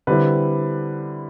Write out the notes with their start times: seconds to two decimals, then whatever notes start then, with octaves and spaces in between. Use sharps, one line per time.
0.07 D3 G3 C4 E4 B4